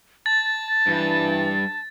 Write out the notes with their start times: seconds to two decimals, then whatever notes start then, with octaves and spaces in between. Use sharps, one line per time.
0.26 A5 A6
0.87 G2 E3